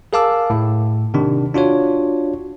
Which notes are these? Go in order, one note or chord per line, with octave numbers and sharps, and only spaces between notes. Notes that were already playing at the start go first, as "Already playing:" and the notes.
G#4 A#4 F5 A5 D6 E6
A2
C3 D#3 D4
D4 F4 F#4 C#5